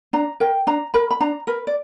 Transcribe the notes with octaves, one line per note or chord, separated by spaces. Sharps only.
D4 A#5
A#4 G5
D4 A#5
A#4 B5
B5
D4 A#5
A#4 B4
D5